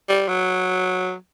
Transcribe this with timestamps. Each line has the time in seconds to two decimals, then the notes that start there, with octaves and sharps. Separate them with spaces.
0.09 G3
0.28 F#3